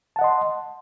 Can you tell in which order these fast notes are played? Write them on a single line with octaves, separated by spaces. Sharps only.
A5 F#5 D#5 C6